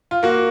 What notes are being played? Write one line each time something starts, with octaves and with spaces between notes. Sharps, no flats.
F4
A#3 F#4